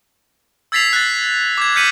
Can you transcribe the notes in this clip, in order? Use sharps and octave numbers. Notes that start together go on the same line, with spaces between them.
E6 G#6 A6 B6 C7 F7
F#6 A6
D6 G#6
F6 G6 B6 C#7 D#7 F#7